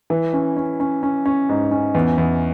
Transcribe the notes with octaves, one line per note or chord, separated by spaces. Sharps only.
E3
C#4
C#4
C#4
C#4
C#4
G#2
C#4
E2
E2